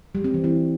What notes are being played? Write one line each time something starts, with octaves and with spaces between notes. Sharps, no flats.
G3
C4
E3
E4